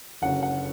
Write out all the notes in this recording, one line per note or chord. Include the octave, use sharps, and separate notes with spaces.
F#1 F#2 D3 F#5
F#5